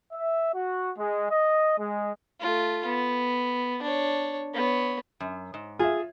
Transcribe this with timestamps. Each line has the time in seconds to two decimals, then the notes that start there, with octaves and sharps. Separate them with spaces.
0.12 E5
0.54 F#4
0.97 G#3
1.30 D#5
1.78 G#3
2.41 A3 F4
2.85 B3
3.82 D4 C#5
4.54 B3 C#5
5.20 F#2
5.54 G#2
5.79 F4 G#4 E5